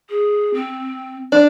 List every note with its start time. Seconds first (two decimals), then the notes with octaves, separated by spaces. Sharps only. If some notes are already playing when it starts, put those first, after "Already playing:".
0.10 G#4
0.54 C4
1.32 D4